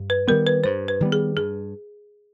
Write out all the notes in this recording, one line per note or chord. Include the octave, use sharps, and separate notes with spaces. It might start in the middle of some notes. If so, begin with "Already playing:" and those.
Already playing: G2
B4
D#3 G3 B3 A#4
B4
G2 C5
B4
D#3 G3 B3
G#4
G2 G#4